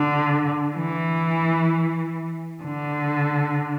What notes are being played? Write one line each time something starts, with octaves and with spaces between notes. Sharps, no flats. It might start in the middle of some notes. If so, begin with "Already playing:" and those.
Already playing: D3
E3
D3